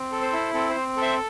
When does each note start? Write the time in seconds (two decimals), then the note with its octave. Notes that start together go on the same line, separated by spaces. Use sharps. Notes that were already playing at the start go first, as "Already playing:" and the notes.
Already playing: C4
0.12 A4
0.22 C5
0.33 E4
0.54 C4 A4
0.70 C5
0.76 C4
0.97 A4
1.02 C5 E5